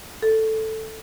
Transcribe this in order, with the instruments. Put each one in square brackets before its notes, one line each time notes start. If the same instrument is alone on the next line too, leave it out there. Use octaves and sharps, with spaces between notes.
[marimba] A4